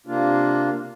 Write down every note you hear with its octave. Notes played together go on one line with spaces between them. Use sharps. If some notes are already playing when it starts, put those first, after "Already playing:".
C3 A#3 D4 F4